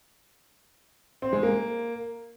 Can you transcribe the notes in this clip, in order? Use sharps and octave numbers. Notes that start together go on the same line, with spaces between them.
C4
G#3
A#3